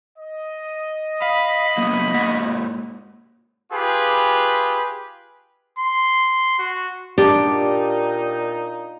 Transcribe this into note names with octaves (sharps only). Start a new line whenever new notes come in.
D#5
F5 B5
F#3 A#3 B3
G#2 A#3 F#5
F4 G4 G#4 B4
C6
F#4
A#2 D4 D#4 G4